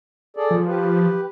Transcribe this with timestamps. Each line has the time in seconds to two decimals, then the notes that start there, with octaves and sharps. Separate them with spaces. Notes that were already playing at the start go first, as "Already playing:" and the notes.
0.36 G#4 A4 D5
0.51 F3
0.67 G4 B4